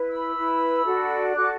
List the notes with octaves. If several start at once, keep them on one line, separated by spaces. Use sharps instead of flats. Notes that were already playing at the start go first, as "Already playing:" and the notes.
Already playing: E4 B4
B5 E6
E4 B4
D4 F#4 A4
D4 F#4 A4 D6 F#6